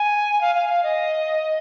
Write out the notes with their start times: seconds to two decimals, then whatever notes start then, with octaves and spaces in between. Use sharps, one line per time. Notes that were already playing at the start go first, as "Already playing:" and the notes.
Already playing: G#5
0.41 F5
0.55 F5
0.69 F5
0.83 D#5